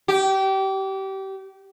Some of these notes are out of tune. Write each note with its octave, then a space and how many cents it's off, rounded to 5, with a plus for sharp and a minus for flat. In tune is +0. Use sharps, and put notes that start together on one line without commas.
G4 -25